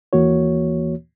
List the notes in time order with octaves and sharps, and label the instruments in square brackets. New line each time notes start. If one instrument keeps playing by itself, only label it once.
[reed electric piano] D#2 E3 A#3 F#4 C#5